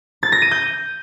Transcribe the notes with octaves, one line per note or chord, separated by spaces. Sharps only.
A6
A#6
D#7
G6